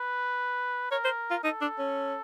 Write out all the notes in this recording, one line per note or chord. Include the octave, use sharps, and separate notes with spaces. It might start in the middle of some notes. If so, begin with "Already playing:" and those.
Already playing: B4
A#4 C#5
C5
F4
D#4 A4
D4
C#4